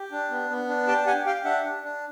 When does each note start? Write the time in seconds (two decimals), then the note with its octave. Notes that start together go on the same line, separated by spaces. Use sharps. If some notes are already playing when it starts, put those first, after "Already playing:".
Already playing: G4
0.12 D4
0.31 B3
0.50 B3
0.69 D4
0.87 G4 G5 A5
1.06 G4 F#5 G#5
1.26 G4 F5 G5
1.45 D4 E5 F#5
1.64 D4
1.83 D4